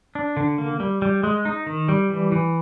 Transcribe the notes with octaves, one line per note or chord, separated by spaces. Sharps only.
D4
D3
A#3
G3
G3
G#3
D#4
D#3
G3
E3
E3